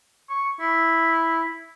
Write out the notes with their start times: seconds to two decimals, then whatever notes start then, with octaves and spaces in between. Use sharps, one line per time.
0.29 C#6
0.60 E4